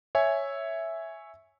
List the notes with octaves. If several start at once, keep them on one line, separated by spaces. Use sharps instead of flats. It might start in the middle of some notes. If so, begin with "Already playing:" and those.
C#5 E5 G#5